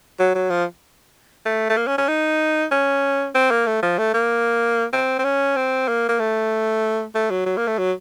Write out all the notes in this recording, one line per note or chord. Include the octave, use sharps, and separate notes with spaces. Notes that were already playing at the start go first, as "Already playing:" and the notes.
F#3
F#3
F3
A3
A3
A#3
C#4
C#4
D#4
C#4
C4
A#3
A3
F3
A3
A#3
C4
C4
C#4
C4
A#3
A#3
A3
A3
F#3
F#3
A#3
A3
F#3